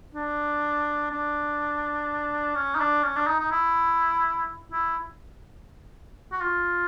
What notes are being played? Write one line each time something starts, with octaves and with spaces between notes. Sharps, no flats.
D4
D4
C#4
D#4
D4
C#4
D4
D#4
D#4
E4
E4
F#4
F4